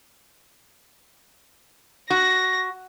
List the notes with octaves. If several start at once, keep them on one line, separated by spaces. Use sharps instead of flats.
F#4 A#6